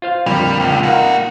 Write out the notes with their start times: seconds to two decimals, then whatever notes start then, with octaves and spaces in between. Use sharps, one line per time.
0.02 F4 C5 F5
0.26 F2 A#2 D3 G3
0.60 C#2
0.83 A#3 D#4 F4 F#5